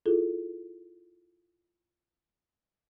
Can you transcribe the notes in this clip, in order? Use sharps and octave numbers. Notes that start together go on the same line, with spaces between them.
E4 F4 G#4 A4